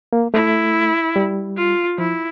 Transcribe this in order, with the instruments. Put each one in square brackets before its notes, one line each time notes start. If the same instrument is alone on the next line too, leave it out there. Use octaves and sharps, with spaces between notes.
[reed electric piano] A#3
[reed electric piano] A3 [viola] E4
[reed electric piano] G3
[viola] F4
[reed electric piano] F3 [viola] E4